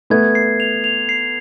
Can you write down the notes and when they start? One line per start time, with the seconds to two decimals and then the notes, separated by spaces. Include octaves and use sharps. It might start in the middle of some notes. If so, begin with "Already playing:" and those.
0.10 A3 B3 G#6
0.35 C7
0.60 F7
0.84 F7
1.09 C7